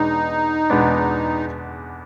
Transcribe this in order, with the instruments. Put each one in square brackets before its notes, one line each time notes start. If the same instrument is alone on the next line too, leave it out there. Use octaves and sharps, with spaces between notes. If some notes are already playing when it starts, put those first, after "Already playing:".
Already playing: [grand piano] E2 B2 G#3 B3 D4 [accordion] D#4
[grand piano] E2 B2 G#3 B3 D4